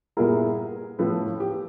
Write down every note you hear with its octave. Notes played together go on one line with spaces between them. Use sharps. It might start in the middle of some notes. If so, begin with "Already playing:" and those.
A#2 G3 B3 E4 G#4 A#4
A2 F3 A3 A4 B4
G4